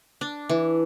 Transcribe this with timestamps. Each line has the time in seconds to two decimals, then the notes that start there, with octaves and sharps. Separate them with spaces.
0.21 D4
0.49 E3